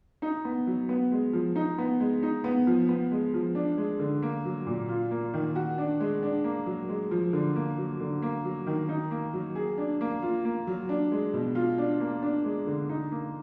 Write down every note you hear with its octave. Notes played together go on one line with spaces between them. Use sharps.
D#4
B3
F#3
B3
G#3
F3
D#4
B3
G#3
D#4
B3
F3
B3
G#3
F3
D4
G#3
D3
A#3
F#3
A#2
F4
A#3
D#3
F#4
D4
G#3
D4
A#3
F#3
G#3
F3
D3
A#3
F#3
D3
A#3
F#3
D#3
D#4
A#3
F#3
G#4
D4
A#3
F4
A#3
F#3
D4
G#3
B2
F4
D4
A#3
D4
G#3
D3
D#4
A#3